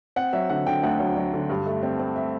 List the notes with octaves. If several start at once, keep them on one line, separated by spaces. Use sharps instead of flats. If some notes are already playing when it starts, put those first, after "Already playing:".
C4 F#5
F#3 E5
D3 F#5
D3 G5
D2 F#5
F#3
F#3
D3
G2
A3
C4
C4
E5